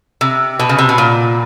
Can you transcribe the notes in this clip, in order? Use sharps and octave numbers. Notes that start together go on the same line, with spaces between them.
C3
B2
C#3
C3
B2
A#2